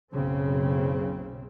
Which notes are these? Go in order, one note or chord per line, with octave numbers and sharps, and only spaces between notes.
F#1 B1 C#3 C4